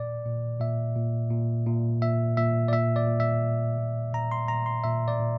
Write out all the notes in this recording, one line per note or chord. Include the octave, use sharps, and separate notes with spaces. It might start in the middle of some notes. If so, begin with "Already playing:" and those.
Already playing: A#2 D5
A#2
A#2 E5
A#2
A#2
A#2
A#2 E5
A#2 E5
D5
A#2 E5
D5
A#2
E5
A#2
A#2
A#2 A#5
C6
A#2 A#5
C6
A#2 E5
D5
A#2